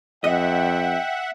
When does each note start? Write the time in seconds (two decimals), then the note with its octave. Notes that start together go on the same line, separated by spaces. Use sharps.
0.24 F2 D#5 E5 F#5 G5